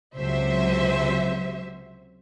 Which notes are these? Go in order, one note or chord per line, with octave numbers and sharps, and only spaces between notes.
C#2 C3 F#3 C5 E5